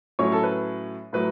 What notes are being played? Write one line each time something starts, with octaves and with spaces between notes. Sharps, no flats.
A2 F#3 C#4 C#5
A4
B4
A2 F#3 B4